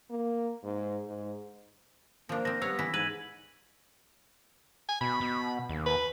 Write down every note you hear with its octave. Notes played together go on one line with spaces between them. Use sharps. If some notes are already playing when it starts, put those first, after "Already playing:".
A#3
G#2
G#2
F3 A#3 D4
F3 C4 A#6
G2 B3 C#5 F5 E6
E3 E4 B6
G#2 B4 G#6 D#7 F#7
G#5
B2 B5
B2
D#2
B4